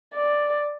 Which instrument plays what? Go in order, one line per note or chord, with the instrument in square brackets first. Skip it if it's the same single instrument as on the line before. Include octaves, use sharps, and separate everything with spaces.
[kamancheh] D5